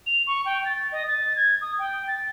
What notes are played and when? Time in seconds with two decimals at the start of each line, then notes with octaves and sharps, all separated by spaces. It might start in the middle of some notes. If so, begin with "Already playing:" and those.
0.06 F7
0.27 C#6
0.46 G5
0.65 A6
0.92 D#5
1.08 A6
1.36 G#6
1.61 D#6
1.79 G5
2.08 A6